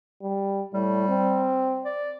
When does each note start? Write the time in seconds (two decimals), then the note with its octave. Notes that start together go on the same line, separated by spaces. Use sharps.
0.22 G3
0.74 A2 G3
1.09 C4
1.85 D5